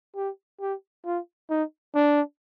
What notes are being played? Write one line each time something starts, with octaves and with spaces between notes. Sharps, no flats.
G4
G4
F4
D#4
D4